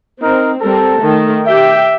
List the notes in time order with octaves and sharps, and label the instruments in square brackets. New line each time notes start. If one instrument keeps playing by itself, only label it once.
[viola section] C4 [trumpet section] D#4 A#4
[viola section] G3 C4 A#4 [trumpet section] A4
[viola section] D#3 A3
[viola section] G4 G5 [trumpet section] E5